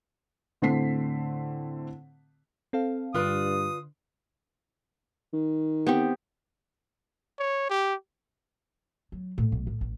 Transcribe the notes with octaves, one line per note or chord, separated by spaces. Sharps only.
A2 D3 A3 C4 B6 C7
C4 A4 F5
G2 D3 F4 B4 D5 D#6
D#3
B3 C4 G4
C#5
G4
F#3
A2
B1
A2
A1